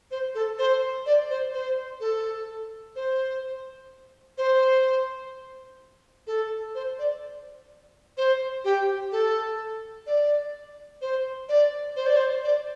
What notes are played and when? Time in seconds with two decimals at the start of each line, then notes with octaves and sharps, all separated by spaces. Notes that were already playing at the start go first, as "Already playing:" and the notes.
0.11 C5
0.35 A4
0.59 C5
1.06 D5
1.30 C5
1.54 C5
2.00 A4
2.96 C5
4.38 C5
6.27 A4
6.75 C5
6.99 D5
8.17 C5
8.65 G4
9.12 A4
10.07 D5
11.01 C5
11.49 D5
11.96 C5
12.07 D5
12.16 C5
12.44 D5